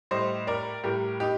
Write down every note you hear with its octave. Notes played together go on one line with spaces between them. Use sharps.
A2 G3 C5 D#5
A#4 D5
A2 G3 G4 A#4
D#4 G4